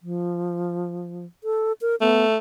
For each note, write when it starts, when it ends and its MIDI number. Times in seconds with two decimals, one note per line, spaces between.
0.01 1.25 53
1.44 1.72 69
1.81 1.95 70
2.01 2.38 57
2.01 2.25 59